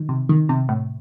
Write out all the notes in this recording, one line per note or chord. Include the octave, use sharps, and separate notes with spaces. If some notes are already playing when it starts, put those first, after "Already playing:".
Already playing: D#3
C3
D#3
C3
A2